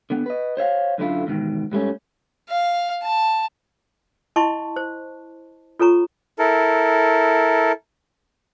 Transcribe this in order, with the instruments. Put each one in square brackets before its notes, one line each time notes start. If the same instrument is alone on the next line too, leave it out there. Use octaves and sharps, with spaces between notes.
[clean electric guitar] D3 B3
B4 D#5
C5 C#5 E5 F5
F#2 D3 A3 E4 F4
E2 G#2 B2 D#3
G#2 G3 A3 C#4
[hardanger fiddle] F5
A5
[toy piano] E4 D#5 A5 C6 C#6
C5
F4 A4 C#5 A#5 C#6
[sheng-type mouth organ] E4 A4 A#4